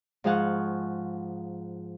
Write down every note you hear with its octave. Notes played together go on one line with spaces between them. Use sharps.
G#2 F3 G#4 F5 F#5 C#6